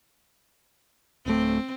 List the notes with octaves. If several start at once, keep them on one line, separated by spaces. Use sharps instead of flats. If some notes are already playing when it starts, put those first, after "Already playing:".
D1 A3 C4